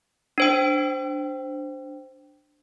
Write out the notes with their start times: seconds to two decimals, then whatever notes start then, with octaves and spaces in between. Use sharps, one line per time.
0.38 D4 C5 G5